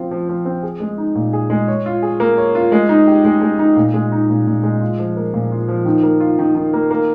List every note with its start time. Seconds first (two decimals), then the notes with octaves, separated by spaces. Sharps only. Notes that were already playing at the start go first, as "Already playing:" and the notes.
Already playing: F3 C4 F4
0.11 F3
0.29 F3
0.45 C4
0.63 G#4
0.80 G#3
0.98 D#4
1.15 A#2
1.33 G#4
1.50 G#3
1.68 C#5
1.86 F4
2.02 G#4
2.20 A#3
2.38 C#5
2.55 F4
2.72 G#3
2.89 D#4
3.07 G4
3.25 G#3
3.42 G#3
3.59 D#4
3.76 A#2
3.94 G#3
4.12 D#4
4.30 A#2
4.47 A#2
4.63 G#3
4.81 F4
4.99 F3
5.17 A#3
5.34 A#2
5.52 F4
5.68 F3
5.85 D#3
6.03 A#3
6.20 F4
6.39 D#3
6.55 D#3
6.73 A#3
6.91 A#3